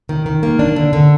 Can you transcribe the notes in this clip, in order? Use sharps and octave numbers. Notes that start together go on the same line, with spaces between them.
D#3
D#3
A#3
D4
D3
D3